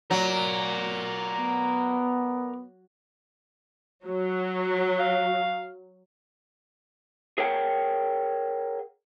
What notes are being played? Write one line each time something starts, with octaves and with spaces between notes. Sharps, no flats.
F#3 A#4 D5
B3
F#3
F5
G#4 A#4 C#5 F#5 G5